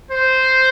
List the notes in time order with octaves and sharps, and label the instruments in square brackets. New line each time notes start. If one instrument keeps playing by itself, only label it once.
[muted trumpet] C5